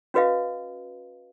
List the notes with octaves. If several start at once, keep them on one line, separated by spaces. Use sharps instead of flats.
C#4 F#4 B4 D#5 F5